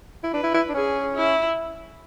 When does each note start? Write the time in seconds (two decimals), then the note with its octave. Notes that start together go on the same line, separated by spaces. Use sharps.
0.24 E4
0.33 D4 B4
0.44 E4
0.54 E4
0.69 D4
0.75 C#4 G#4
1.16 E4